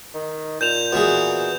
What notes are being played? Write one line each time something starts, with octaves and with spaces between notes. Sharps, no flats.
D#3
A#2 G6 E7 F7
B2 E3 G#4